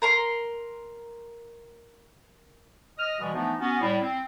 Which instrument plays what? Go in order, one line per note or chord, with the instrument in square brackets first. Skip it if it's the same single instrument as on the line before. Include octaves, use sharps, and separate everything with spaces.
[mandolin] A#4 A#5 C6
[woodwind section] D#5 D#6 F6
B2 D3 E3 G3 G#3
E3 F3 A3 B3 D4 D#4
B3 C#4 F#4
A2 G3
C4